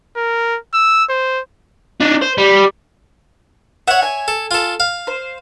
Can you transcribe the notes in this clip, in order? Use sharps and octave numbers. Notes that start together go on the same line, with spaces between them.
A#4
E6
C5
D4 D#4
C5
G3
C#5 E5 F#5
G#5
A4
F4 A4
F5
C5